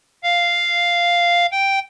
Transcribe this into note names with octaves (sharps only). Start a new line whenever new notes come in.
F5
G5